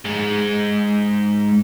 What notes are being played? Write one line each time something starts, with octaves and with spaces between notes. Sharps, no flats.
G#2 G#3